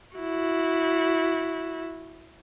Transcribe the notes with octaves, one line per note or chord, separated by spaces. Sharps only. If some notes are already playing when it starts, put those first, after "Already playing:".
E4 F#4